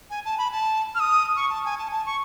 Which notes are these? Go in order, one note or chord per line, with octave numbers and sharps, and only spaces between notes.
G#5
A5
B5
A5
F6
D#6
C#6
A5
G#5
A5
A5
C#6